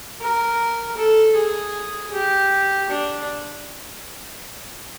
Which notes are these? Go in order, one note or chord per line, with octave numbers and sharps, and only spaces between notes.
A#4
A4
G#4
G4
D4